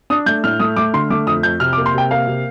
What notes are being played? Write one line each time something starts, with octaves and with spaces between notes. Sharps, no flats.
D4 D#6
A3 G6
A2 F6
A3 D#6
A3 D6
D3 C6
A3 D6
F2 D#6
F2 G6
C3 F6
D6
A#3
C6
C3 G5
A#3 F5
C3